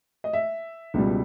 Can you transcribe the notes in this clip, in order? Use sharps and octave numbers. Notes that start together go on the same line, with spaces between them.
D#5
E5
C#2 B2 G3